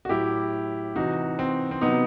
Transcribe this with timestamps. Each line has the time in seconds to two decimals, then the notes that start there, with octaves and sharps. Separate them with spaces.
0.05 F#4
0.09 A2 F#3 E4 G4
0.96 C3 E3 D#4 F#4
1.39 C4
1.71 C4
1.81 C3 F#3 B3 D#4